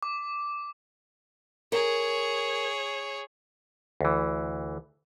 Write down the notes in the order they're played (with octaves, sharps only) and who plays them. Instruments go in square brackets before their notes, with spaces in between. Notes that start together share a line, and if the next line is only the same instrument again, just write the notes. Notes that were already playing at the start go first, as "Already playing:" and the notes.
[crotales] D6
[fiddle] G#4 C#5 [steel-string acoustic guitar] A#4
[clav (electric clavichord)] D2 E3